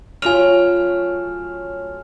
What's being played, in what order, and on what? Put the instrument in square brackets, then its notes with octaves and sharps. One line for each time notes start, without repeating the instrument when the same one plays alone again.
[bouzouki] F#3 A3 C#4 [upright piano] F4 F7 [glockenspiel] G#5 F6